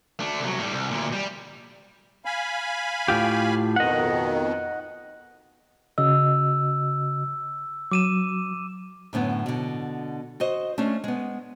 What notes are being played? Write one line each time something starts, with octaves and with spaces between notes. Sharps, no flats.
A3 D4
C2 F#3
A2 G3
C2
D2 A#2
G3
F5 G#5 B5
A2 F4 G4
F2 B2 D#3 D#5 F#5
C#3 F#4 D#5 E6
F#3 D6 D#7 E7
F#2 A2 D3 B3
B2 D3
F#4 C5 D#5
A3 C#4 D4 F4
G#3 B3